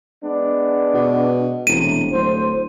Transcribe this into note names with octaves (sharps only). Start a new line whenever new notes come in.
G#3 B3 D4
B2
E1 A2 C3 D#7
D1 C5